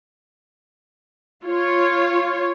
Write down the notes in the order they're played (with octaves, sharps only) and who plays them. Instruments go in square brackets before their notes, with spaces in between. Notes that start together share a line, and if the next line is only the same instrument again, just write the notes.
[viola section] F4 C#5